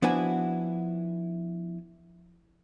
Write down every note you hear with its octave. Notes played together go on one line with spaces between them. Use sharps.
F3 B3 D4 E4 F#4 G#5